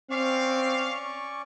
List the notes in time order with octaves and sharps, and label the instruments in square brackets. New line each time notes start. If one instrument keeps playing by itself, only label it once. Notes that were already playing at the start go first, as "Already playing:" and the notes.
[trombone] C4 [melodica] C#4 D5 C#6 [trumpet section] F5